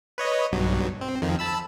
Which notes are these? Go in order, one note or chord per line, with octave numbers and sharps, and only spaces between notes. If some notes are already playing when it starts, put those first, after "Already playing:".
B4 C#5 D#5
B1 G2 F#3
C4
F2 D#3 F3
A5 B5 E6